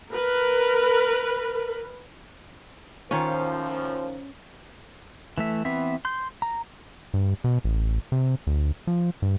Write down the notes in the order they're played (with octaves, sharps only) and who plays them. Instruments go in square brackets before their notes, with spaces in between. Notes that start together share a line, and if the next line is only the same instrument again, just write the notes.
[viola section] A#4 B4
[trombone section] F#2 A2 F3 [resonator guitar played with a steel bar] D#3 F4 [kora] C#4 [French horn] C5
[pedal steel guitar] E3 A3 E5
E3 B3 C4 E5
C6 G6
A#5
[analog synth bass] G2
B2
A1
C3
D2
F3
G2